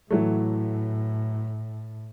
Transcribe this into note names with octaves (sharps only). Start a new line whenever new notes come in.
A2 E3 F#3 A3